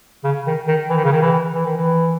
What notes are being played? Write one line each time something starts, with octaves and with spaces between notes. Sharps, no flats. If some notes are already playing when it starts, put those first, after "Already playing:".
C#3
D#3
D#3
E3
D#3
C#3
D#3
E3
E3
D#3
E3